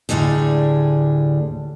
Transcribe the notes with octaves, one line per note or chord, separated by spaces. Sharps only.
D2 A2 D3 G3 D4 G#4